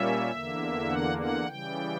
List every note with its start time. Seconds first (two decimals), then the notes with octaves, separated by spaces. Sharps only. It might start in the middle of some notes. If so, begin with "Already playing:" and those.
Already playing: A#2 G3 A#3 C#4 E5
0.31 E2 D3 A#3
0.89 F#5
1.18 F#5
1.46 C#3 E3 G3 G5